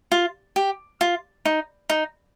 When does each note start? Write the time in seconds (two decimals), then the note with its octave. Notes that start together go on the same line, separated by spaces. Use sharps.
0.12 F4
0.56 G4
1.01 F4
1.45 D#4
1.90 D#4